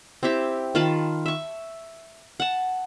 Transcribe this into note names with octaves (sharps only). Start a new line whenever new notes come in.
C4 E4 G4 E5
D#3 F4 A5 B5
E5 C#6
F#5 A5